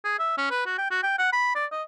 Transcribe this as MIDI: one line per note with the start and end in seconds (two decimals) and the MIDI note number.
0.05 0.16 68
0.19 0.34 76
0.38 0.50 61
0.51 0.62 71
0.66 0.76 66
0.78 0.88 79
0.91 1.02 66
1.03 1.14 79
1.18 1.32 78
1.33 1.51 83
1.55 1.65 74
1.72 1.82 75